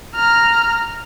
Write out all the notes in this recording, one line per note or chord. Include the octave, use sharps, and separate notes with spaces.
A#5 F6